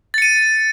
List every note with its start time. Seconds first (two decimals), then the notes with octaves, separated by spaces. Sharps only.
0.14 A6
0.18 C#7
0.22 D#7